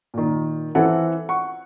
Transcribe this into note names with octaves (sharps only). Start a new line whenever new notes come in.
A#2 D#3
E3 C4 A4 F#5
F#5 C#6